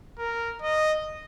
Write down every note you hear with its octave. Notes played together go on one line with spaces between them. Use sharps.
A#4
D#5